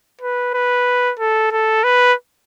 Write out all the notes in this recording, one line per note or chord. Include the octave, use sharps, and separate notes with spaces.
B4
B4
A4
A4
B4